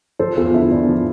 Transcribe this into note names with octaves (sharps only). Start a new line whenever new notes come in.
F3 A4 C5
E2 F4 A4
D3 E4
E2 D4
F3